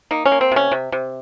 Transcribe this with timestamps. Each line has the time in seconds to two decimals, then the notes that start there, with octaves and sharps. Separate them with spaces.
0.11 A#3 D#4
0.25 C#4
0.32 A#3
0.41 C4
0.52 C3 C#4
0.72 C3
0.92 C3